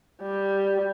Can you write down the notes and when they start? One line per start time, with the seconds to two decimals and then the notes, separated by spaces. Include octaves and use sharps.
0.22 G3